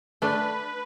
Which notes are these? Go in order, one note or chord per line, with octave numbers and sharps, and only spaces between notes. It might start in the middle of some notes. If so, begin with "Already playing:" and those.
A3 D4 B4